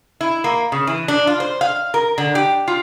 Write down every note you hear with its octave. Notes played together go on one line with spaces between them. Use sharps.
E4
A#3
C#3
E3
D4
F4
C5
F5
A#4
D3
G4
F4